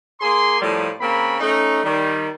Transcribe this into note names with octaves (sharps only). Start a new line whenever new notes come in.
A#3 G#4 C6
A2 F3 G3 A3 A#3
C#3 A#3 C4 B5
A3 C#4 D#4
D#3 G3